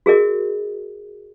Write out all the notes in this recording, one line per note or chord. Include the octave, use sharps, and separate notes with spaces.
F#4 G#4 A#4 D#5